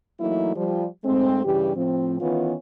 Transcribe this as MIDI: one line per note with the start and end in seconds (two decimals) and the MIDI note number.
0.19 0.54 52
0.19 0.54 54
0.19 0.54 57
0.19 0.54 58
0.19 0.54 63
0.19 0.54 64
0.55 0.85 53
0.55 0.85 55
1.04 1.40 44
1.04 1.40 56
1.04 1.40 57
1.04 1.40 60
1.44 1.75 43
1.44 1.75 49
1.44 1.75 52
1.44 1.75 55
1.44 1.75 67
1.75 2.16 45
1.75 2.16 53
1.75 2.16 60
2.20 2.53 51
2.20 2.53 52
2.20 2.53 59
2.20 2.53 61
2.20 2.53 65